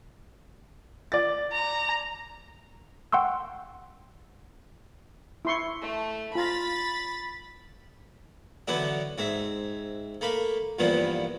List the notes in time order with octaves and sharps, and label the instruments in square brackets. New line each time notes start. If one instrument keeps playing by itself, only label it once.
[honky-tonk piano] D5 A6
[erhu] A#5
[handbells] F#5 G5 C6 C#6 E6
[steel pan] E4 C6 C#6
[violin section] A3
[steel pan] F4 A#5 [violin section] B5 A6 B6
[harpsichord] D3 E3 F#3 B3 D4
G#2 C4 E5
A3 A#3 B5
G2 A#2 E3 F3 B3